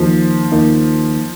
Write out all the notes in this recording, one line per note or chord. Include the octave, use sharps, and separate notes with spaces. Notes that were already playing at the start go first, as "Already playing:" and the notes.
Already playing: D#2 D#3 F3 A#3 D#4
D#2 D#3 A#3 D#4